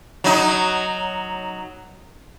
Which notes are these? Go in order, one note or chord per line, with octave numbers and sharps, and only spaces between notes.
F#3 D#4